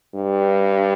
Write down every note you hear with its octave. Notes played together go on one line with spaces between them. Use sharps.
G2